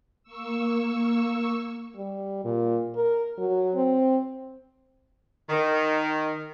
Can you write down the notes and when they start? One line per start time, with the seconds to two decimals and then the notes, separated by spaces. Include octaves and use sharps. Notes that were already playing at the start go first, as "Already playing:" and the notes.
0.23 A#3 C#6 E6
1.96 G3
2.44 A#2
2.96 A#4
3.38 F#3
3.75 C4
5.50 D#3